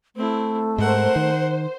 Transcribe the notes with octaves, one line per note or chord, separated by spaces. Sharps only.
A3 C4 E4
G#2 A#4 C5 F#5
D#3